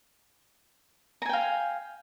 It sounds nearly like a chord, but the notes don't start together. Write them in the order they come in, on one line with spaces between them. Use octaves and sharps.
A#5 G#5 G5 F5